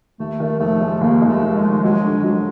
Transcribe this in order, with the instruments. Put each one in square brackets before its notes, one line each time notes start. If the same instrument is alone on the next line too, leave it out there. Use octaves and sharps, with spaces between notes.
[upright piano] D#2 [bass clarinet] A3
[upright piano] D#3
[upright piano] F1 [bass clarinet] A3
[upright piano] G#3
[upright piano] D#2 [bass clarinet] A#3
[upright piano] G#3
[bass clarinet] A3
[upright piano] D#3
[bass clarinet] G#3
[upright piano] F1
[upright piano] F#3 [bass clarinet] G#3
[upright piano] D3
[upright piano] F#3 [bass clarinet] G#3